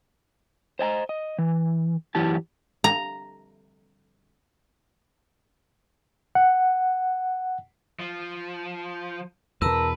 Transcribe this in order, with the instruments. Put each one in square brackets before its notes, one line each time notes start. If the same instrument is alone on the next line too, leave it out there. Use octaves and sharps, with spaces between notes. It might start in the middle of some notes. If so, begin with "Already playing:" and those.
[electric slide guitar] C5 D#5 G#5 A#5
D#5
E3
F#2 E3 E4 G4 A5
[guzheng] A#5
[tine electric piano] F#5
[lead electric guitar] F3
[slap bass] E2 B2 [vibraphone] A#4 A5 A#5 [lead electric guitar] B4 [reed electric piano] E6